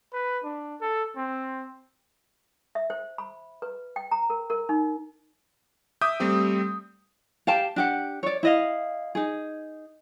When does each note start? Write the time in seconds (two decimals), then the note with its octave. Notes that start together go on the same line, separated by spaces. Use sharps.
0.13 B4
0.44 D4
0.81 A4
1.16 C4
2.75 E5
2.90 C5
3.18 B5
3.62 B4
3.96 G5
4.11 A#5
4.30 A#4
4.50 A#4
4.69 D#4
6.01 E5 D6 D#6 G6
6.20 G3 A3 C4 G4
7.47 G4 F5 G5 A5
7.76 D4 G4 F#5
8.23 C#5 D5
8.43 E4 D#5 F5
9.15 D#4 G#4